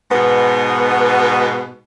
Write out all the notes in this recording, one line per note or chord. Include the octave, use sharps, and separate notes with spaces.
G#2 B2 B3